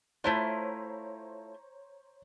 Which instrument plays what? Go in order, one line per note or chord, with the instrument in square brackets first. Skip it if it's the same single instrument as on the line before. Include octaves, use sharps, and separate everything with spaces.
[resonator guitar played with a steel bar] A3 E4 F4 [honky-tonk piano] C5 C#5 A#5